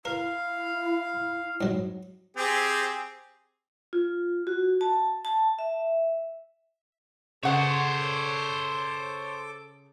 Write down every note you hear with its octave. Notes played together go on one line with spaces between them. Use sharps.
E4 A#4 F5
G#2 F#3
C4 G4 G#4
F4
F#4
A5
A5
E5
C#3 A4 C5 C#5 F#5 D6